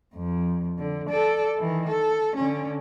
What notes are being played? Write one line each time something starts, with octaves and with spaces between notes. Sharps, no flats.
F2
D3
A4 D5
D#3 E3
A4
D3 C#4